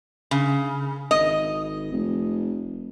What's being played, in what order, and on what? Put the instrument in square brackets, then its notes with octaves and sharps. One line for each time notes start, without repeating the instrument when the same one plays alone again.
[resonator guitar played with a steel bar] C#3
[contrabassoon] G#1 [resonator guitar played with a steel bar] D#5
[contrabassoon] F1